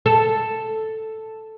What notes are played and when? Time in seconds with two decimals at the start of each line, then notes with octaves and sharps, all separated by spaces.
0.06 A4